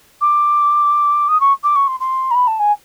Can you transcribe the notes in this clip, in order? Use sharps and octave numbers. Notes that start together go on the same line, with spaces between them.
D6
D#6
C#6
D6
C#6
C6
C6
A#5
B5
A5
G#5